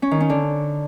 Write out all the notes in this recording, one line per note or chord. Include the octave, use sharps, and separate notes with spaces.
C#4
D#3
C#4
D3